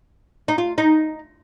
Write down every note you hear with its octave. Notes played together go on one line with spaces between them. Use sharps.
D#4
F4
D#4